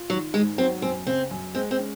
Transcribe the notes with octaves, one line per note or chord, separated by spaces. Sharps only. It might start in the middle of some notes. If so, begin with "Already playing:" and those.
Already playing: F4
D#3 F#3
G#2 G#3
F#3 C4
F#2 C4
C#3 C4
F#2
G#3 C4
C4
C#4